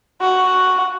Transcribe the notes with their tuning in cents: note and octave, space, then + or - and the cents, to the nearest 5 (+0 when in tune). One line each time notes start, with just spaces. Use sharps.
F#4 +0